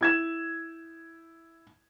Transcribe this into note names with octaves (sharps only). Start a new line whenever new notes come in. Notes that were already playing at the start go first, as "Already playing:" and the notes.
E4 G#6 E7